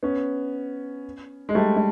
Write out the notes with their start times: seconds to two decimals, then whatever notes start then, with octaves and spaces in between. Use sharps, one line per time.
0.03 B3 C#4
1.49 G#3
1.55 G3 A3
1.76 A3